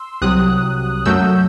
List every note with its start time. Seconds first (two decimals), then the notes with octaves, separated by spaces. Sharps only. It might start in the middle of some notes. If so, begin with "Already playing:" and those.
Already playing: C6 E6
0.22 C2 C3 F#3 D#6 F#6
1.06 F#2 F#3 A3 E6 G6